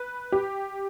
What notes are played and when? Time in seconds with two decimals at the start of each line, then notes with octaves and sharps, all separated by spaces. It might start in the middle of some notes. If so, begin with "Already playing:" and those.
Already playing: B4
0.32 G4